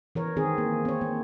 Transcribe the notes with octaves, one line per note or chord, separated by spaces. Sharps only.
E3 A#4 C#5
D#3 C4 G#4
A#3
C4 C#5
A#3